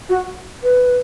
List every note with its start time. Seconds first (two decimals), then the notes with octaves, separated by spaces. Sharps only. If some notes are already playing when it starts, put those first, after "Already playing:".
0.09 F#4
0.63 B4